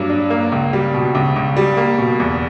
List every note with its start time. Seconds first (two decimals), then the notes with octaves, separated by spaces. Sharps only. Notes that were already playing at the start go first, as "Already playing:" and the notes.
Already playing: G2 F#3 A#3
0.10 D4
0.30 A#3
0.52 C#2
0.73 G3
0.94 B2
1.15 C#2
1.36 C#2
1.56 G3
1.77 A#3
1.98 B2
2.20 E2